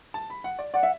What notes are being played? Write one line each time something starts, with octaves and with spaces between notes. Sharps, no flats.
A5
B5
F#5
D5
D5 F#5
E5